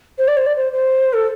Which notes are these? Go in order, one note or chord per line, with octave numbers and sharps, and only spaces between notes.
C5
D5
C5
D5
C5
C5
A4